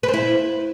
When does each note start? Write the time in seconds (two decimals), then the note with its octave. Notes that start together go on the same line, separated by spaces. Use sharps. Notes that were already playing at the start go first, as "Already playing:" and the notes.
0.03 B4
0.08 C4
0.14 E4